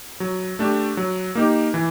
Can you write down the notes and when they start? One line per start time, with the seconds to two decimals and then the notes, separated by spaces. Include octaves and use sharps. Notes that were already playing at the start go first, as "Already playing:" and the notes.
0.20 F#3
0.59 A3 D4 G4
0.97 F#3
1.35 A#3 D#4 G4
1.74 E3